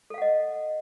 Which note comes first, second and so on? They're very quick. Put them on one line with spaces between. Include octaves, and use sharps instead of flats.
A4 F5 F#5 D#5